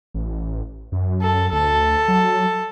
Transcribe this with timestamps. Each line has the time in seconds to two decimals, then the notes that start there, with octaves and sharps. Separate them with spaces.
0.15 A1
0.92 F#2
1.22 A4
1.52 D2 A4
2.08 F#3